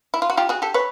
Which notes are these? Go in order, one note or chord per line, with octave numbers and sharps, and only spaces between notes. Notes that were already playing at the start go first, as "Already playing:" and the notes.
E4
F4
F#4
F4 G4
F#4 G#4
G4 A4
B4 C#5